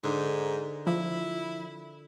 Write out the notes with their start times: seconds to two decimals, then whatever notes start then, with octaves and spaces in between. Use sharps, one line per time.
0.03 G#2 D3 D#4 A#4
0.87 F3 E4